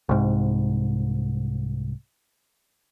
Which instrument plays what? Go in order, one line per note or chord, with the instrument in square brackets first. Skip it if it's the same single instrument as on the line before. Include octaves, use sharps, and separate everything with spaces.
[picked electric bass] C2 G#2